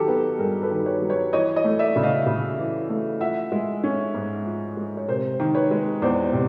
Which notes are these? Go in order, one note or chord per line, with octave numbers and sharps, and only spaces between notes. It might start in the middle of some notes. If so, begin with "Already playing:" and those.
Already playing: D#3 F#3 G4 A4
B3
G2 G#4 A#4
A4 B4
D#3
B4 C#5
F#3
B4 C#5
E3 C#5 D#5
C#5 D#5
A3
D5 E5
C#3
D#5 F5
C#3
E3
A3
F3 E5 F#5
G#3
C#4
G#2
F3
G#3
C#5
C3 A#4 C5
D#3
B4 C#5
G#3
E2 C5 D5
C3